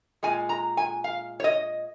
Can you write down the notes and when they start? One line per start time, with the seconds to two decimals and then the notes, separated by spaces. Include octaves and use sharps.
0.23 A#2 G#3 G#5
0.49 A#5
0.77 G#5
1.04 F5
1.40 C#5
1.44 D#5